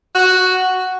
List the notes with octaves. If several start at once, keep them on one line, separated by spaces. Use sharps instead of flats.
F#4